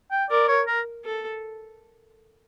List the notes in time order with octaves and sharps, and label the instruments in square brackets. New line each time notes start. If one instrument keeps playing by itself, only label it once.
[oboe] G5
[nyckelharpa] A#4 [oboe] D5
[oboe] C#5
A#4
[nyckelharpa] A4